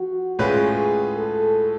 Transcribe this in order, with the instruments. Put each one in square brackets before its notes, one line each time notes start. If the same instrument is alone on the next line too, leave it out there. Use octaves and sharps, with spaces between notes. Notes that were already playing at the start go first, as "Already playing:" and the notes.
Already playing: [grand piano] F3 [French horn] F#4
[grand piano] A2 G#3 C#4 F4 B4 [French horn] G#4
[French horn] A4